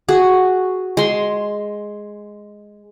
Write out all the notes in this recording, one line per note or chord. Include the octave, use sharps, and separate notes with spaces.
F#4 G#4
G#3 C6